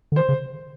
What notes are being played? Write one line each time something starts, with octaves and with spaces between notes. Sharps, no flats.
D3
D#3 C5
C#3